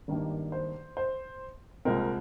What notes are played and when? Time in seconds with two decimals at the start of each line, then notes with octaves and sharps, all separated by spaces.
0.08 G#1 G2 D#3 G3 A#3
0.52 C5
0.97 C5
1.85 C2 A#2 G#3 C4 A#4